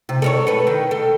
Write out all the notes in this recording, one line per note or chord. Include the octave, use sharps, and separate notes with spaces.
C3
A4 A#4 C#5
A4 B4
D#3
A4